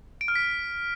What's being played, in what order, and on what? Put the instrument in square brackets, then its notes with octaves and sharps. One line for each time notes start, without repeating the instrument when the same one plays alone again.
[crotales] D7
F6
B6